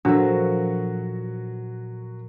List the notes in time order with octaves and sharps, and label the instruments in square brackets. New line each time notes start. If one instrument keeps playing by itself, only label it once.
[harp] A#2 F3 A4 [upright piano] F#3 F#4 [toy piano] D4